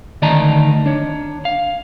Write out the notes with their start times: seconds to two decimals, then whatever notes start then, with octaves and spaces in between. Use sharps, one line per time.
0.22 D2 D#3 D5 D#5 A5 A#5
0.86 D4 C#5
1.45 F5